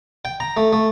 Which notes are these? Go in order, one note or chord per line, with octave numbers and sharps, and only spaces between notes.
G5
A#5
A3
A3